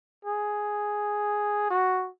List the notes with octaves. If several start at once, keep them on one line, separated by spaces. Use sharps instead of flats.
G#4
F#4